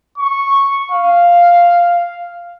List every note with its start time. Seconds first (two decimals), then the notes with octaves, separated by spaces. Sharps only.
0.18 C#6
0.91 F5